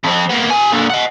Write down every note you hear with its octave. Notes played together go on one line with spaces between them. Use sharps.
F2 C4
A#3 B3
G4 G#5
A#2 D3
D#5 F#5